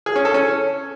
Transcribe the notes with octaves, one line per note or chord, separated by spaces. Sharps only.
G#4
C#4
A4
C#4